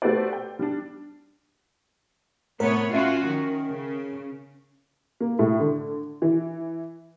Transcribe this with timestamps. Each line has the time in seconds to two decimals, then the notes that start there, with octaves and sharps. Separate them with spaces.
0.02 A3 F#4 G4 B4 C5 D5
0.32 G5
0.59 G3 D4
2.60 A2 C3 B3 A#4 C#5
2.93 C#4 F4 F#4 E5
3.26 D#3
3.69 C#3
5.20 A#3
5.39 A2
5.60 D3
6.22 E3